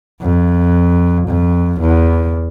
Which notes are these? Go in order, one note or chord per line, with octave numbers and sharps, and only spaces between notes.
F2
F2
E2